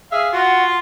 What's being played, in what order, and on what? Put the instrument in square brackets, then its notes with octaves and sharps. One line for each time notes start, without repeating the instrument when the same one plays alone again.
[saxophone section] G#4 E5 F5
[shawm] F4 [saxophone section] F#4 [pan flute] F#5